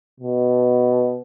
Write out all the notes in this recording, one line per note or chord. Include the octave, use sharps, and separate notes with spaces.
B2